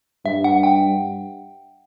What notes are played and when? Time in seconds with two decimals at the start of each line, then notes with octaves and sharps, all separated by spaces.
0.25 G2 E5
0.44 F#5
0.63 G5